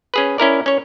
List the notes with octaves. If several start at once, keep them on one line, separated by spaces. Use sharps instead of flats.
C#4 G#4 B4
C#4 E4 A#4 D5
C#4 C#5